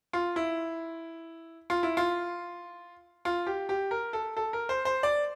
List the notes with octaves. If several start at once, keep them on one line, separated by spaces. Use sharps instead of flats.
F4
E4
F4
E4
F4
F4
G4
G4
A#4
A4
A4
A#4
C5
C5
D5